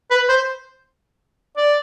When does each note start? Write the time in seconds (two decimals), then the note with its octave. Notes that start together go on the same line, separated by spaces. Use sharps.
0.11 B4
0.29 C5
1.57 D5